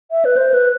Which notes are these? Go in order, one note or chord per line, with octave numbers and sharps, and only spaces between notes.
E5
B4
C5
B4